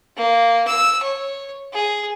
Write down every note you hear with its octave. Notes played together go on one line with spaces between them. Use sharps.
A#3
E6
C#5
G#4